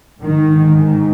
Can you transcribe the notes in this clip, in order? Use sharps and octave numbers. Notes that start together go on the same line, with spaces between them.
G#2 D#3
D#3